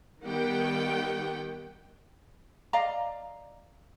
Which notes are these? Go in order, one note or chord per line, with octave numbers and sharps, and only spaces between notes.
D#3 G3 B3 G4 F#5 G5
D5 D#5 F5 A#5